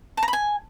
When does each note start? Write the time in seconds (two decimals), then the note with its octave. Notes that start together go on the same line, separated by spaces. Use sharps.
0.17 A5
0.23 A#5
0.28 B5
0.33 G#5